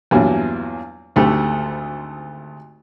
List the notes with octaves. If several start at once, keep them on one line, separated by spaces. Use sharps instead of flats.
E2 G2 A#2 F#3
G#1 D2 A3 G4